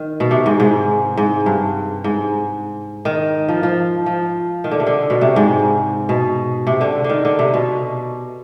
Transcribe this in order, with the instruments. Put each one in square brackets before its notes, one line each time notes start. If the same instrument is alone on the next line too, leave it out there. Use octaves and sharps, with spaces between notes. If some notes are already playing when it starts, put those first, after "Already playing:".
Already playing: [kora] D#3
B2
C3
G#2
G#2
G#2
G2
G#2
D#3
F3
F3
F3
D#3
D3
C3
D3
B2
C3
G#2
B2
C3
D3
D3
D#3
D3
C3
B2